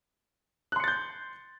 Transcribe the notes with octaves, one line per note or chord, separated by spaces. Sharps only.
C6 F#6 G6 A6 C#7